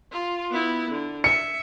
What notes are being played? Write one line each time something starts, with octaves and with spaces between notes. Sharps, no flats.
F4
B3 E4
D3
E5 C#7